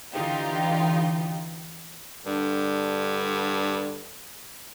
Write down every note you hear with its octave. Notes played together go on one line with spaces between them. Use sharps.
D3 E3 D#4 F4 G4
G2 D3